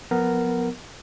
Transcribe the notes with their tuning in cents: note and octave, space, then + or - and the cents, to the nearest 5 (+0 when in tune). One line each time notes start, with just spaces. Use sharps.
F3 +45 B3 +0 A#4 -10